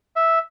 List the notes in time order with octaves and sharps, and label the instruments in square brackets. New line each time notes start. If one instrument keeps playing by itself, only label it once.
[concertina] E5